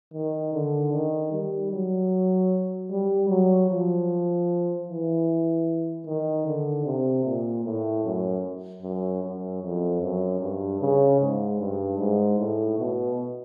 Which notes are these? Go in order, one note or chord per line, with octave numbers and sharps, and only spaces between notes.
D#3
D3
D#3
G3
F#3
G3
F#3
F3
E3
D#3
D3
C3
A#2
A2
F#2
F#2
F#2
F2
F#2
G2
C#3
G#2
G2
G#2
A2
B2